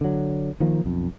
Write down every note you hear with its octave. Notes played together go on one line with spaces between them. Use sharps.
D3 F#3
D#3 F3 A#3
B1 F2